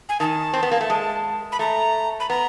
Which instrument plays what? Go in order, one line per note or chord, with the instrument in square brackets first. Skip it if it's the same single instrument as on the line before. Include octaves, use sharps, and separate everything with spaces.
[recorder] G#5
[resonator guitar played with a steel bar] D#3 [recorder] A5
[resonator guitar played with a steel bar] C4
B3
A#3
A3
G#3
[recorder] B5
[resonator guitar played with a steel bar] A3 [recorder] A#5
[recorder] B5
[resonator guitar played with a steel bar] B3 [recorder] A#5